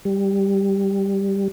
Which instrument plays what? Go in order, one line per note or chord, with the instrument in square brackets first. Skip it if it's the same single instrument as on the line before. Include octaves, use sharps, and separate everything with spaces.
[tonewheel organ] G3